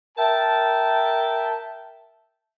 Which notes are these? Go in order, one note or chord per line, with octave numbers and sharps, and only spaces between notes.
A#4 E5 G5 A5